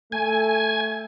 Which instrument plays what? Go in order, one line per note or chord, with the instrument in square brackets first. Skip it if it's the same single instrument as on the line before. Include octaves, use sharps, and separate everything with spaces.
[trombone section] A3 [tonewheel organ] G#5